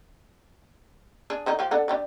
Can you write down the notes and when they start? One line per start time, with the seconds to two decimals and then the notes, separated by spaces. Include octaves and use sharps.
1.30 D4 G#4
1.46 D3 D#3 D#4
1.59 F3 G4
1.71 D4 A4 F#5
1.88 D4 G4 D5